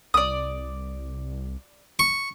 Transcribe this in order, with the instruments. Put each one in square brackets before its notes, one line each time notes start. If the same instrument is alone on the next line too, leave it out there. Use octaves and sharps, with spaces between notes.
[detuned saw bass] C2 [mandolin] D5 D#6
[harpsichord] C#6